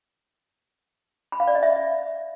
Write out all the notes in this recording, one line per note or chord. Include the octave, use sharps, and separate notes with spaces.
B5
F5
D5
D#5
E5